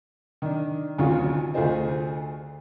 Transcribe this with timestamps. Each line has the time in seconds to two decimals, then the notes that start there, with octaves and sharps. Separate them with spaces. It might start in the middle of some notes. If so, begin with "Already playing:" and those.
0.42 D#3 D4
0.98 G#1 D2 F#3 C#4 F4
1.54 D2 A3 F4 G#4 C5 D#5